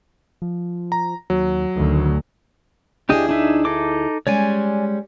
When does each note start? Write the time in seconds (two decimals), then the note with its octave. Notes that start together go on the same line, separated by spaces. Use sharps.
0.42 F3
0.92 A#5
1.30 D#2 F#3
1.77 D2 D#3
3.09 D2 D4 E4 G4 G#4 D#5
3.29 D4 D#4 E5
3.65 D#4 A4 D6
4.27 G3 G#3 C#4 C#5 D5 G#5